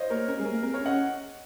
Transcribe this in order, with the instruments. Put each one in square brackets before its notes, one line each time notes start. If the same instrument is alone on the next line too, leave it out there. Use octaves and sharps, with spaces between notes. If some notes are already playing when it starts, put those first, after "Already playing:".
Already playing: [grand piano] C5 C#5 D#5 F5
[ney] A#3 [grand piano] A#4 C#5
[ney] C#4 [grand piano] A#4
[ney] G#3 [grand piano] G#4
[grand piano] A#4
[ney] A#3
[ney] C4 [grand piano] A#4
[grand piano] A#4 C#5
[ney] C#4
[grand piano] D#5 F#5